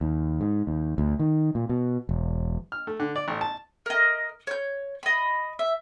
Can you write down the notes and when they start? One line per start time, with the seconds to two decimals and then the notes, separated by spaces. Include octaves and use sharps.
0.01 D#2
0.41 G#2
0.67 D#2
0.98 D2
1.19 D#3
1.55 A#2
1.69 B2
2.09 E1
2.72 F6
2.87 A3
3.00 D3
3.16 D5
3.28 A1
3.41 A5
3.86 A#4 D#5
4.47 C#5 G6
5.03 D#5 B5
5.59 E5